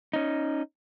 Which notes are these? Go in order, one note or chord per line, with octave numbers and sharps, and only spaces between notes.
C#4 D#4